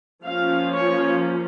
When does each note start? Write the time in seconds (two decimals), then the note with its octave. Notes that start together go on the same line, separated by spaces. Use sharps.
0.25 F3 A#3 C#4 F5
0.73 C#5